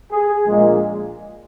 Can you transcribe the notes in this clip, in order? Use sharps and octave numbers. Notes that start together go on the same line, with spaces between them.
G#4
A#1 A#2 G#3